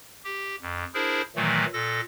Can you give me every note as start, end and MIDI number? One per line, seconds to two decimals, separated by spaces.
0.24 0.56 67
0.62 0.84 41
0.94 1.22 62
0.94 1.22 64
0.94 1.22 68
0.94 1.22 70
0.94 1.22 72
1.36 1.65 46
1.36 1.65 51
1.36 1.65 52
1.36 1.65 54
1.36 1.65 57
1.73 2.01 46
1.73 2.01 69
1.73 2.01 94